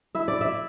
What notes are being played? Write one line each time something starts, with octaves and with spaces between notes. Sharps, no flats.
E4 E5
D5
E5